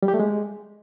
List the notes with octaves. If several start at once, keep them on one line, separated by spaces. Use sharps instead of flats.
G3
G4
A3
G#3